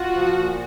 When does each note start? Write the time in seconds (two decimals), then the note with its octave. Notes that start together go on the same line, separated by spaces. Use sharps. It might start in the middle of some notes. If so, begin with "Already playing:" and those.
Already playing: F4 F#4
0.16 F3
0.38 A#2